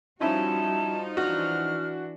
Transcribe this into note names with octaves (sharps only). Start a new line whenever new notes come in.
F3 G3 C#4 D#4 E4 F#4 A5
E3 D4 F#4 F6